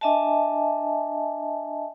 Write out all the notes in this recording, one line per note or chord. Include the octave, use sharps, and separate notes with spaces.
D4 D#5 E5 G#5 A5